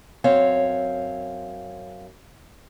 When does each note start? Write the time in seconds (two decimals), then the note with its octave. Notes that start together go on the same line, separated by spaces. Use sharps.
0.24 F#2 C4 C#5 F5